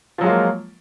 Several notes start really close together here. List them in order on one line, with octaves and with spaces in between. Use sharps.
F3 F#3 G#3 F4 A#3